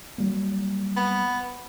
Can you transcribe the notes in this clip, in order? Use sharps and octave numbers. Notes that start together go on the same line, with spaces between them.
F#3 G3 A#3
B3